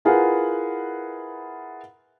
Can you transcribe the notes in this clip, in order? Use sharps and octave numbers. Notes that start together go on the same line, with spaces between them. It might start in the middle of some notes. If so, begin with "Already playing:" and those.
E4 F4 G#4 A#4 B4 F#5